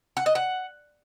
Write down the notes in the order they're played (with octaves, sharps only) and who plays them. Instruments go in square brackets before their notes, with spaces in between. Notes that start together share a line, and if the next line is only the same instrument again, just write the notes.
[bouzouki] F#5
D#5
F#5